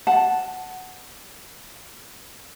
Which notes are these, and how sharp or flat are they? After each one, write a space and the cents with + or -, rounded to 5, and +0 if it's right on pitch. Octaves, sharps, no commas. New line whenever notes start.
F#5 +0 A5 +0